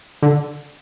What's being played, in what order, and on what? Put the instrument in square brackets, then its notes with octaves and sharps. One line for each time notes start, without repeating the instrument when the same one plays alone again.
[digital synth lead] D3